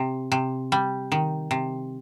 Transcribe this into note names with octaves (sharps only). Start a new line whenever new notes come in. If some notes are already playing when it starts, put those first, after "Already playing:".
Already playing: C3
C3
G3
D#3
C3